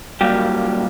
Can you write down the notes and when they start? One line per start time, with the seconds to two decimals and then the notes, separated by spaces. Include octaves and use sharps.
0.21 A#2 F#3 G3 G4